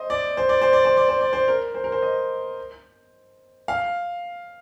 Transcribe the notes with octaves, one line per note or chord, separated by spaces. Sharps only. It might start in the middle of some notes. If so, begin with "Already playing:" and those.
Already playing: C5 D#5
D5
C5
D5
C5
D5
C5
D5
C5
D5
C5
A#4
C5
A#4
C5
D#5
F5